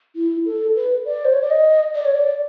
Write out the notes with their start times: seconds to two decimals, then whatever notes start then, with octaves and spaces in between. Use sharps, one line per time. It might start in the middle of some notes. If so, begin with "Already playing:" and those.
0.16 E4
0.46 A4
0.76 B4
1.05 D5
1.25 C5
1.33 C#5
1.42 D5
1.50 D#5
1.95 D5
2.05 C#5
2.15 D5